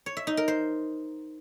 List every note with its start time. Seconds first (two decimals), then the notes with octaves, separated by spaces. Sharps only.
0.06 C#5
0.17 E5
0.27 D#4
0.37 A#4
0.48 C5